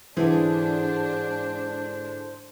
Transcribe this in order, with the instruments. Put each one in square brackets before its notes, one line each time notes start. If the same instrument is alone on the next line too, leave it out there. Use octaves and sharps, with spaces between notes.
[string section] G#2 D4 [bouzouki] D3 E4 G#4 [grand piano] E3 [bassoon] C5